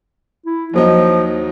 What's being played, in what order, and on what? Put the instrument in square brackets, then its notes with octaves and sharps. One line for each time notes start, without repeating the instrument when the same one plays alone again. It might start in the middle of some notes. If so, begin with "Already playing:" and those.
[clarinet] E4
[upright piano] D#2 F#3 D#4 [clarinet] F3